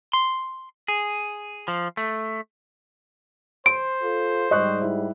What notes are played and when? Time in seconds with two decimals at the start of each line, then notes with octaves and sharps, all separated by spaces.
0.13 C6
0.88 G#4
1.68 F3
1.97 A3
3.66 C5 C6 D7
4.03 F4 A4
4.51 G#2 G3 D#5 C#6 F#6
4.82 E4